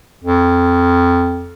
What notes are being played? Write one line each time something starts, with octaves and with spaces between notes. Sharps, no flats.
F2